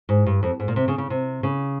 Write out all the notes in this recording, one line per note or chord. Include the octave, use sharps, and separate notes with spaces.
G#2
G2
F2
G#2
A#2
C3
C#3
C#3
C3
C#3